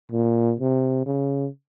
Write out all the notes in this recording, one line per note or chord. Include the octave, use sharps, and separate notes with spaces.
A#2
C3
C#3